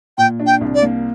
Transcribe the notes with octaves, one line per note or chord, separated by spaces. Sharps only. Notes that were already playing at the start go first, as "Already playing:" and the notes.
A#2 G5
D4
G5
C2
D5
A#3